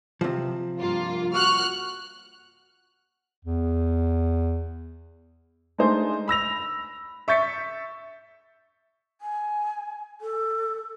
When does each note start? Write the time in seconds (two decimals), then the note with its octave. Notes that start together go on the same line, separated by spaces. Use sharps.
0.21 C3 F3
0.80 G2 A#3 F4
1.34 F#4 C#6 F6 F#6
3.45 E2
5.78 G#3 A3 D4 D#4 C5 G#5
6.28 B5 E6 A#6 F7
7.28 E5 C#6 G6 A6 B6 C#7
9.21 G#5
10.21 A4